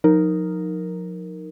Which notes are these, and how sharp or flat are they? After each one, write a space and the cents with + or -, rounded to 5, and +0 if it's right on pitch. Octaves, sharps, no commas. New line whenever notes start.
F3 +40 D#4 +0 A#4 +0